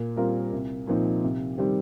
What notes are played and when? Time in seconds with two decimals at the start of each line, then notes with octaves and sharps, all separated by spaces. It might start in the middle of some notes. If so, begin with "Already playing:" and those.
Already playing: A#2
0.16 G3 C4 F4 A#4
0.53 C2
0.87 A#2 F3 C4 D#4
1.23 C3
1.58 D#3 G3 C4 G4